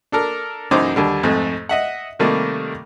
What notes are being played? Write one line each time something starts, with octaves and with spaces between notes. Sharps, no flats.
D4 A4 A#4
B1 F#2 E3 D#4 C5 D6
D#2 D3 G3
F2 G#2 A3
D#5 E5 F#5
C3 D#3 G3 A3 A#3